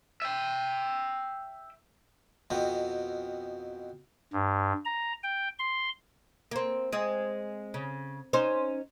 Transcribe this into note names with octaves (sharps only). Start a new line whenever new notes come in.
E5 G5
F2 B2 C4
G2
A#5
G5
C6
A#3 C4
G#3 C4 G#4
C#3
C#4 D#4 C5